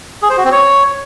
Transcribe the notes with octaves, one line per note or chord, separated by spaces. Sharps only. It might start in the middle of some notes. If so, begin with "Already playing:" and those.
G#4
C5
F#4
C4
C#5